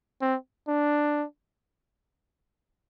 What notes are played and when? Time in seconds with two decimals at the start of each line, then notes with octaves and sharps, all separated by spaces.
0.22 C4
0.69 D4